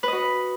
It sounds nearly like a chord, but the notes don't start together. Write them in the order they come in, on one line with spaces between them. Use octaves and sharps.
B4 D#5 F#4